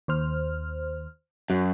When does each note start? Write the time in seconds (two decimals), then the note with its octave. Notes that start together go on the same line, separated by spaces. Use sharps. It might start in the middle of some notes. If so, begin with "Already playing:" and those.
0.08 D#2 C5 F6
1.50 F#2 F#4